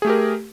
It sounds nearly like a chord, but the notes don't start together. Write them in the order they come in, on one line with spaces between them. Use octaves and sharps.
G#4 A3 G4 A#4